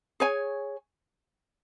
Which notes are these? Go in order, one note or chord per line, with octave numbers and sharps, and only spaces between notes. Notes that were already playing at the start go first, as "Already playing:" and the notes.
G#4 C#5 G#5